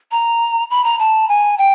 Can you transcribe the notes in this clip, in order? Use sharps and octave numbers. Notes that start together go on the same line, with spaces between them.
A#5
B5
A#5
A5
G#5
G5